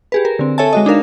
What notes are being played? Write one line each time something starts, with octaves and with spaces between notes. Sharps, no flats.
G4 G#4 B4
A#4
D3 C4
A4 C#5 E5 G#5 A5
G#3 F#4 D#5
D4 D#4 A#4 F5